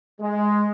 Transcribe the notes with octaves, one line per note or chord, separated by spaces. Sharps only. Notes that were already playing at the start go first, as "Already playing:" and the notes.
G#3